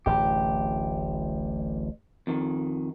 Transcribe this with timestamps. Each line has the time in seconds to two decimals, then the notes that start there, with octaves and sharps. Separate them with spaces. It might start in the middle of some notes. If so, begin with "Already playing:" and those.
0.06 D1 A1 G4
2.27 F2 D#3